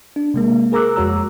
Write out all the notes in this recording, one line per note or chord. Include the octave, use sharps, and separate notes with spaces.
D4
C3 G#3 A#3
G#4 A#4 A#5 D6 E6 F#6
F2 G#3 F#4 C#5 A#5 E6